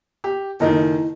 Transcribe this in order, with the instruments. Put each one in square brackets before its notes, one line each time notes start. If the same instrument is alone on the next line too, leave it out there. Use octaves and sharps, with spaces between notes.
[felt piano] G4
[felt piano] F#1 D#3 [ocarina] E4 [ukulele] A4 A#4 D#5